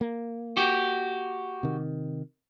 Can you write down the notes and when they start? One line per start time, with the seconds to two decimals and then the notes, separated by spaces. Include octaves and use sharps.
0.01 A#3
0.57 F#4 G4
1.63 C3 D#3